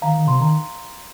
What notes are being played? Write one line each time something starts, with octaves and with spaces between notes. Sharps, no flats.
D#3 F5 A#5
D#3
C3 C6
D#3 A#5